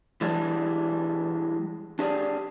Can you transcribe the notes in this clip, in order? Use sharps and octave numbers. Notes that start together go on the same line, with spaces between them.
E3 G3 G#3 D4
D4 G4 G#4 D5